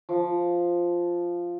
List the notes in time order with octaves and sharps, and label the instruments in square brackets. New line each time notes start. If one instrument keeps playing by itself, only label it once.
[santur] F3